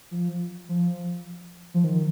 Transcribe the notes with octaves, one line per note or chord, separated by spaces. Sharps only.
F3
F3
F3
D#3